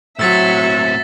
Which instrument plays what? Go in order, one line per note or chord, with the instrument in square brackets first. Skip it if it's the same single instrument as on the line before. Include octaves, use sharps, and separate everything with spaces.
[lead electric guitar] A2 C4 [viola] F#3 C#6 [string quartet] E5 [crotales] E6 A6 B6